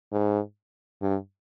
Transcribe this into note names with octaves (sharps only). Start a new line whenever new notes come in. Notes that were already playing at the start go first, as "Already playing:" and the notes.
G#2
G2